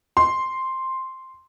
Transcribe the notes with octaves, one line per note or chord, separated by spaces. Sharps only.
C6